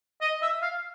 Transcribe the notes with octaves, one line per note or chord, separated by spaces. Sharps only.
D#5
E5
F5